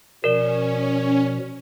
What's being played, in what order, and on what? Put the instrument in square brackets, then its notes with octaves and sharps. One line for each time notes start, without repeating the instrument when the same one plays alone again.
[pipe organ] B2 F3 [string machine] C#4 [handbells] A#4 D5